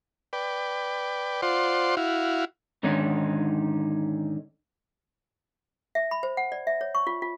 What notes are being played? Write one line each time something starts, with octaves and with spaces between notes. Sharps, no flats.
B4 D5 G5
F4 C5 D5 F#5 C6
E4 F#4 F5
G#2 D3 D#3 C#4 D#4
E5
B5
C5
F#5
D5
E5
C#5
C#6
F4
F4